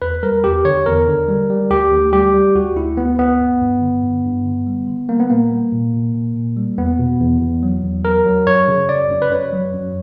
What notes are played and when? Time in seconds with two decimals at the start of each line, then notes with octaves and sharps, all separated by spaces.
0.02 E2 B4
0.23 G3 A#4
0.44 E2 G4
0.65 D3 C#5
0.86 E2 A#4
1.08 D3
1.28 G3
1.50 G3
1.71 D2 G4
1.92 D2
2.13 G3 G4
2.34 G3
2.55 D2 F#4
2.76 D2 E4
2.97 D2 B3
3.19 D2 B3
3.40 G2
3.61 G2
3.82 D3
4.03 G2
4.24 G2
4.45 D3
4.67 G3
4.88 D3
5.09 G3 A#3
5.20 B3
5.30 A#2 A#3
5.51 G3
5.72 A#2
5.93 A#2
6.14 A#2
6.36 A#2
6.57 G3
6.78 E2 B3
6.99 B2
7.20 E2
7.41 E2
7.63 F#3
7.84 E2
8.05 F#3 A#4
8.26 F#3
8.47 F#2 C#5
8.68 C#3
8.89 F#2 D5
9.10 F#2
9.22 B4
9.31 F#2 C#5
9.52 F#3
9.74 F#2